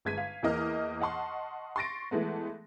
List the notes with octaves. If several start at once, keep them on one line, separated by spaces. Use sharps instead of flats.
G1 G#3 G#6 B6 D#7
F5
E2 E3 A#3 D#5 D6 F6
D#5 F#5 A5 C6 C#6
C6 C#6 A6 A#6 D7
E3 G#3 A3 B3